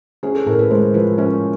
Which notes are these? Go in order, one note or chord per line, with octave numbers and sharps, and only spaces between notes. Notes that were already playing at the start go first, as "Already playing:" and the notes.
C#4 G#4
A4
A2 A#4
B4
G#3 C5
F3 B4
C#4